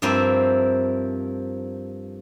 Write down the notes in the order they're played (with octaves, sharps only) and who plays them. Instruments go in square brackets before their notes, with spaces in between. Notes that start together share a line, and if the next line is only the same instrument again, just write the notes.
[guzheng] G2 F3 A#3 C4 E4